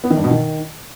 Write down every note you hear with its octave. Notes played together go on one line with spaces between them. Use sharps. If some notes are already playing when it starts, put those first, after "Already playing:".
B3
D#3
G2
B2
D#3